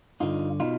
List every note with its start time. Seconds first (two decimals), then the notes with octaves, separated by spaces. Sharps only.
0.20 G2 D3 D#4 F4
0.60 B2 D#4 F4